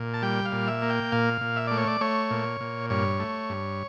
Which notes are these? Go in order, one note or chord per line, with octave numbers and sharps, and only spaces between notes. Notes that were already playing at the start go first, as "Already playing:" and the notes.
Already playing: A#2
A5
G3 G5
F5
A#2
E5
A#3
G5
A#2 F5
A#2
E5
A3 D5
C#5
D5
A3 C#5
A#2
A#2
G2 C#5
A3
G2